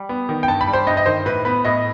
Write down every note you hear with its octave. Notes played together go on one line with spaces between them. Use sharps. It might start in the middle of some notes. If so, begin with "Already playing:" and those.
Already playing: G3
B3
D#3
G5
G2 A5
B5
G3
C5
G2 D#5
D#5
D#3 C5
A2 B4
B3 B4
A2 D#5